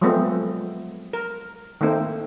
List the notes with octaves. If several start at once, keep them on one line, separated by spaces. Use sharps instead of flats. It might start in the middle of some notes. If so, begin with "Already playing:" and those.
F3 F#3 G#3 A3 B3 C4
A#4
D#3 A3 A#3 C4 D#4